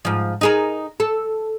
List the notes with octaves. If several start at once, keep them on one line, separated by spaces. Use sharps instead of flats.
G#2 F3
D#4 G#4 A#4
A4